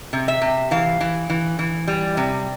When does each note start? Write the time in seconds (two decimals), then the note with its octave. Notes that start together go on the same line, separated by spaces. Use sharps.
0.13 C3
0.28 E5
0.41 C3
0.71 E3 F5
1.01 E3
1.30 E3
1.59 E3
1.87 G3
2.17 C3